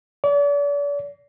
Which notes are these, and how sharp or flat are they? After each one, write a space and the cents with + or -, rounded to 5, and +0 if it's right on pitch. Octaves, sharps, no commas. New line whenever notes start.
D5 -40